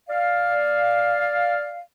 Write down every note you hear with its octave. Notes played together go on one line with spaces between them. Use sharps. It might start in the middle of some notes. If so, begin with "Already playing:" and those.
D5 F5